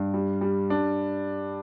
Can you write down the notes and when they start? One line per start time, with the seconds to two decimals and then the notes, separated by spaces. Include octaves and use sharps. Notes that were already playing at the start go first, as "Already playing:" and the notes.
Already playing: G2
0.14 G3
0.41 G3
0.70 D4